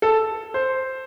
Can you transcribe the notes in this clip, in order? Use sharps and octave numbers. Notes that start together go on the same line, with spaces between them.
A4
C5